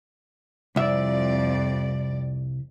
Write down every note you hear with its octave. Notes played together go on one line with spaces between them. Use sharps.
C2 F2 D5 E5